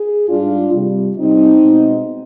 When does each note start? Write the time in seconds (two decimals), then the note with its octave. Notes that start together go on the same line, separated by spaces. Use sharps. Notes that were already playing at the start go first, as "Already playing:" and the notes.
Already playing: G#4
0.29 G#2 G3 D4 F4
0.73 C3 G3
1.17 C3 G3 C4 D#4
1.62 B2 G#3